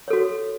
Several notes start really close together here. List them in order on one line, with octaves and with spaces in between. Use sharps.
C#5 A4 F#4